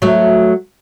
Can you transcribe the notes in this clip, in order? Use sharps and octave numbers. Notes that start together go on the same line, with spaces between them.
F#3 A3